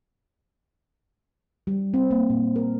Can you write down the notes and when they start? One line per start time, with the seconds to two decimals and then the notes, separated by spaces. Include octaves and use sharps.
1.67 G3
1.94 C4
2.11 A#3
2.30 A#2
2.56 A#4